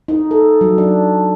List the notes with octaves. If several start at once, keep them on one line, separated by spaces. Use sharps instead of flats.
D#4
A4
F#3
D4